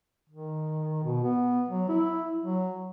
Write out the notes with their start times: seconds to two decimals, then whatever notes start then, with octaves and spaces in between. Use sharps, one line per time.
0.29 D#3
1.04 B2
1.24 B3
1.69 F#3
1.89 E4
2.41 F#3